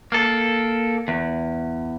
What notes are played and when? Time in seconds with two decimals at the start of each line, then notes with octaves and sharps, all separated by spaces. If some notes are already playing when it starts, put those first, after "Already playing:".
0.12 A#3 A4
1.08 E2